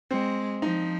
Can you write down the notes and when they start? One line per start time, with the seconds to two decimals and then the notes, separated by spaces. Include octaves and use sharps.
0.11 G#3 C4
0.62 F3 D#4